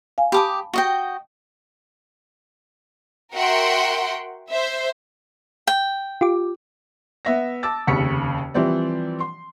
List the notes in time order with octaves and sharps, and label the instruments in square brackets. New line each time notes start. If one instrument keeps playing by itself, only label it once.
[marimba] F5 G#5
[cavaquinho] G4 D6 D#6 [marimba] A5 B5
[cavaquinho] F#4 D#5 G5
[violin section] F#4 A#4 E5 F#5 G5 C6
C5 E5
[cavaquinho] G5
[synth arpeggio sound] F4 G4 D6
[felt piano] B3 E5 A#6
A5 D6 E6 A6
F1 D#2 C#3 C#6 B6 C#7
E3 F3 G3 C4 E4 D5
C6